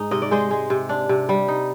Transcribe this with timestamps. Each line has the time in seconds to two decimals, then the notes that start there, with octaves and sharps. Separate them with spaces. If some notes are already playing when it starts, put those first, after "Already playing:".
Already playing: G#2 D#4
0.11 C3 D#5
0.22 D5
0.31 G#3 C5 D#5
0.51 G#3
0.70 C3
0.89 D4
1.09 C3
1.29 G3
1.48 D#4